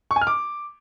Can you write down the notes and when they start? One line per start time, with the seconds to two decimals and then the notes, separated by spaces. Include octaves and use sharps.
0.11 C#6
0.16 G#5
0.21 F6
0.27 D6